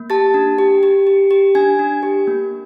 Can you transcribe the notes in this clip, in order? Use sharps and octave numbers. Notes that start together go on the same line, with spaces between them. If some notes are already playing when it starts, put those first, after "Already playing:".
Already playing: A#3
G4 A5 A6
D4
G4
G4
G4
G4
D4 G#5 G#6
D4
G4
A#3